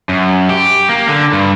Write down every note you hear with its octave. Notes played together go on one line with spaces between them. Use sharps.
F#2
G4
A#3
D3
G2